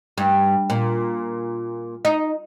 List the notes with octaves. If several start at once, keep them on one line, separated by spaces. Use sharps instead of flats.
G2
A#2
D#4